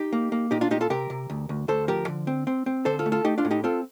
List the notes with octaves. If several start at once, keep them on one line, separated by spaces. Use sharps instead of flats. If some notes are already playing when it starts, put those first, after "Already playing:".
Already playing: D#4 G4
A#3
A#3
A#2 D#4 G4
D4 F4
A#2 D#4 G4
F4 A4
C3 G4 A#4
C3
D2
D2
D2 A4 C5
F3 G4 A#4
D3
C4
C4
C4
D3 A4 C5
F4 A4
A3
F4 A4
A3 D#4 G4
D4 F4
A2
D#4 G4
C4 F4 A4